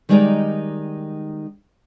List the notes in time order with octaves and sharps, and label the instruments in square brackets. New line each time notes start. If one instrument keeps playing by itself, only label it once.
[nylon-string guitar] D#3 G3 G#3 D#4 A#4 D5